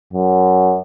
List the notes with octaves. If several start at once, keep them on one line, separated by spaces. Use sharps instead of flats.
F#2